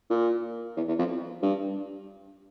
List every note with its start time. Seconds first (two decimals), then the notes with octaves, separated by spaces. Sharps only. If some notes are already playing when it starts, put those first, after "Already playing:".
0.10 A#2
0.77 E2
0.88 E2
0.99 F2
1.43 G2